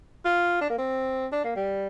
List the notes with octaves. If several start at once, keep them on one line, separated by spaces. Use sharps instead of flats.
F4
D4
A#3
C4
D4
A#3
G3